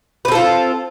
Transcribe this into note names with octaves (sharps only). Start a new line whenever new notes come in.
C4 F4 A4 B4